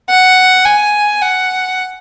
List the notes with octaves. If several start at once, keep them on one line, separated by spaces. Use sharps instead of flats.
F#5
G#5
F#5